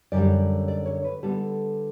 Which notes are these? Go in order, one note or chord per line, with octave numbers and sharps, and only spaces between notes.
F#2 D3 G3 D5
D5
C#5
B4
D3 G3 B3 A4